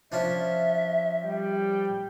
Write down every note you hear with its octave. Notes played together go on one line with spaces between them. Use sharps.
F3 C#4 D4 E5
G3 G5